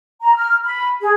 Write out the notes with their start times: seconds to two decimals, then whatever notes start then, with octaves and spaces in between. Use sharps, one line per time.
0.23 A#5
0.35 F6
0.65 B5
1.01 G#4